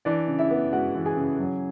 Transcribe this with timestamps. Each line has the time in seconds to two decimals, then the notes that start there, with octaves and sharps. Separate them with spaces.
0.05 E3 D4 D5
0.27 C#3
0.39 E4 E5
0.51 B3
0.73 G#3 F#4 F#5
0.95 E3
1.05 G#4 G#5
1.17 C#3
1.40 F#3